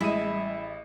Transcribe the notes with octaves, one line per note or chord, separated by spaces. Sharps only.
A1 G3 G#3 E4 D#5 D#7